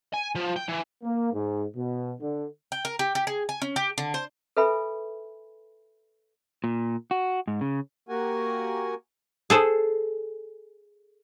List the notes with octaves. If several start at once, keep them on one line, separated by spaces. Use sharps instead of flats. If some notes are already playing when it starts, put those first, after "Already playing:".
G#5
F3
G5
E3
A#3
G#2
B2
D3
G5
A#4
G4
G4
G#4
G#5
C#4
G4
D3
C5
A4 B4 E5 G#5 B5
A#2
F#4
G#2
C#3
A#3 F#4 G4 A#4 F#5 G#5
G#4 A4 C5